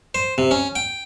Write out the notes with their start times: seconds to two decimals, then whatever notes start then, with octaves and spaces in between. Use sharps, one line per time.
0.15 C5
0.38 C3
0.51 C#4
0.76 G5